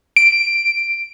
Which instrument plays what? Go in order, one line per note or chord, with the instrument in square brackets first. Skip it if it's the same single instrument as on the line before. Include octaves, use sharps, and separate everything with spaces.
[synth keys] D7